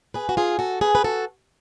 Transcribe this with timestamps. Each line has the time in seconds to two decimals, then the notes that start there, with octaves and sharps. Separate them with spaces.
0.14 G#4 B4
0.29 F#4
0.37 F4 G#4
0.59 F#4 A4
0.81 G#4 B4
0.95 B4
1.04 F#4 A4